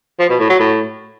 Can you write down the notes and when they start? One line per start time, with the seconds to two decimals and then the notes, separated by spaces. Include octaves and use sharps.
0.19 F3
0.29 B2
0.39 A2
0.49 F#3
0.60 A2